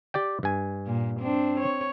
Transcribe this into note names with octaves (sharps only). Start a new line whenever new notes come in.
G4 D5 G5
G2 G#5
A#2
C4 D4
C#5